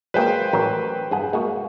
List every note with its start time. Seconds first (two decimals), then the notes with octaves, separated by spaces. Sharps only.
0.14 F#3 G#3 A#3 B4 C5 G5
0.53 A1 F#3 A#4
1.11 G2 G#4 F#5
1.33 G#3 A#3 F#4